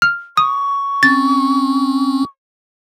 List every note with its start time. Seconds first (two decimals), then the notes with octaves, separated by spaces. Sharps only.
0.02 F6
0.37 C#6 D#6
1.03 C4 C#4 A6